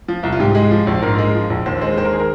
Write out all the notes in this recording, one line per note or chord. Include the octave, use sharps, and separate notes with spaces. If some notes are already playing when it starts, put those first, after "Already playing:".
F3
C2
F4
G#2 G4
G#3
F3
A#1
G#2 A#4
G#3
F3
A#1
D#2 C5
G#3 C5
D#3 C5
A#4
G#4
A#4